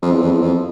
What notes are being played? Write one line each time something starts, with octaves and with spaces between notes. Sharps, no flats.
F2
E2
F2
E2
F2